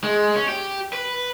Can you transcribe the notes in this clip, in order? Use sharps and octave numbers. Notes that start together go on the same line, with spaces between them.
G#3
C#4
G4
B4